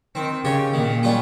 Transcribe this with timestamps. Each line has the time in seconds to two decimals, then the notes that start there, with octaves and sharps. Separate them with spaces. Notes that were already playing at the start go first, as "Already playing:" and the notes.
0.15 D#3 C4
0.44 C#3 G4 C#5
0.74 A#2 D#3
1.03 G3 C#4 F4